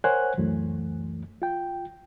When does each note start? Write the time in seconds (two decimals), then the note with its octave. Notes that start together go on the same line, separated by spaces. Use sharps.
0.04 A#4 C5 C#5 F#5 G#5 F#6
0.37 C#2 F#2 E3 A3
1.42 F4 G5